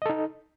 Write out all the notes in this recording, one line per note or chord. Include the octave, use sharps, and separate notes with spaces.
D#4 A4 D#5